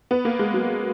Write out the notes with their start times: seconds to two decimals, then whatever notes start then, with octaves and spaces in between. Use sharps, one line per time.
0.11 B3
0.25 A#3
0.39 G#3
0.54 F#3